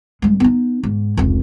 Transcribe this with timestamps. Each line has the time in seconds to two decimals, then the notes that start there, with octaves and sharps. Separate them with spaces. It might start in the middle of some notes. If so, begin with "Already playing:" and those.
0.22 G2 G#3
0.40 B3 D#4
0.83 G#2
1.17 F1 C#2